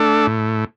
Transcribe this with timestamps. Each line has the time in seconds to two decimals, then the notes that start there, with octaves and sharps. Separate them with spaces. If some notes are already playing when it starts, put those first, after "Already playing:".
Already playing: A3 D4 A4
0.27 A2